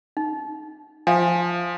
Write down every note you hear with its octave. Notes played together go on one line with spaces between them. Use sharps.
D#4
F3 E5 F5 G#5